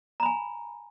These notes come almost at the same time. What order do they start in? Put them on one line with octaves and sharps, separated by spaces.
A#5 B5 G#5